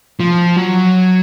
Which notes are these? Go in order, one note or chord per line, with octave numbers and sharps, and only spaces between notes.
F3
F#3